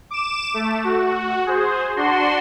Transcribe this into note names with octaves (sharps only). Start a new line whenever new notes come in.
D6 E7
A3
F#4
G#4 C5
D4 F#4 C6